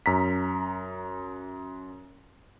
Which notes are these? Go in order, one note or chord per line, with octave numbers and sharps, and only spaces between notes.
F#2 A#5 B6